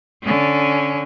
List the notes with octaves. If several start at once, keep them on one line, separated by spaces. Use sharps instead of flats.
D3 C#4